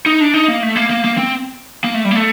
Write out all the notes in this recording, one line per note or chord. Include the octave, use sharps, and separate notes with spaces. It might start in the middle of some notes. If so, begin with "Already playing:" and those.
D#4
D4
D#4
A#3
A3
A#3
A#3
A#3
C4
A#3
A3
G3
A#3
A3